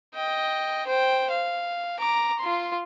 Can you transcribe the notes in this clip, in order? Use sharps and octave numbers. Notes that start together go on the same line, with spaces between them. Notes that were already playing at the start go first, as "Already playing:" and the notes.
D#5 G5
C5 G5
F5
A#5 D6
F4 C6